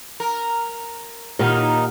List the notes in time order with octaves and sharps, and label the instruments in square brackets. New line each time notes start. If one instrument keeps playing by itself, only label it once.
[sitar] A#4
[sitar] D#2 A#3 D#4 [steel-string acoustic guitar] A#2 [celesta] G4 F#5 F6